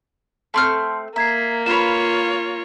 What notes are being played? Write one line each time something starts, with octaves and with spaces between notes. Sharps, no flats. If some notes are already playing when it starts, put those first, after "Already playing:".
A3 C4 A5 C6 F6
A#3 E5 A#5 G#6 C7
F4 B4 C#5 F5 E7